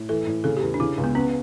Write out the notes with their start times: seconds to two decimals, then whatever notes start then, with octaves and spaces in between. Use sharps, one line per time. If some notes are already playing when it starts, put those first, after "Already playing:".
Already playing: A2
0.09 E3 A4
0.27 A2
0.44 C#3 A4
0.57 G4
0.62 E2
0.74 D4
0.80 C#3 E4
0.98 C#2
1.04 B3
1.15 B3 C#4